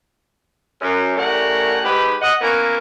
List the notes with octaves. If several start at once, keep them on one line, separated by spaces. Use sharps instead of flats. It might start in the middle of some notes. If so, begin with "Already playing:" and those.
F#2
A2 G3 A3 C#4 A#4 F#5
G#2 G4 B4
D#5 F#5
E3 A#3 B3 C#4 A#4